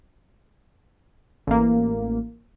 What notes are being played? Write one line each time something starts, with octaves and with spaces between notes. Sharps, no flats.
A1 A#3